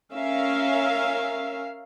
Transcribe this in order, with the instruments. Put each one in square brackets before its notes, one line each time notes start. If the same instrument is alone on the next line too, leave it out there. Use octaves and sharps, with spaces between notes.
[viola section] C#4 A#4 E5 F5